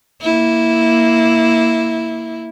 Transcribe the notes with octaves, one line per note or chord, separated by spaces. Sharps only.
A#3 E4